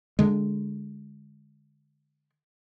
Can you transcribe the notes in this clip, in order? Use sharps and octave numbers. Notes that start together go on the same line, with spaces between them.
D3 G#3